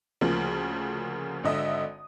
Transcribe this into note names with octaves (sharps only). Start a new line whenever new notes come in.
D2 C#3 F3 A#3
G#1 D3 D#5 E5 D#6